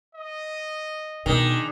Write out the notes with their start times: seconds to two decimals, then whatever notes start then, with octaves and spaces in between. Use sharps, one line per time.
0.15 D#5
1.26 B2 D#3 D4 G#4